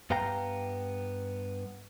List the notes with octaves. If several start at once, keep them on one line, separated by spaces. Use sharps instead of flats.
G2 B3 F5 G5 A#5